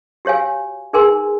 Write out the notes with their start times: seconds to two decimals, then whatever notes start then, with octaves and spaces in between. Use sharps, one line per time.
0.25 F#4 G4 C#5 F5 G#5
0.93 D#4 G#4 A#4 B4 G#5 C6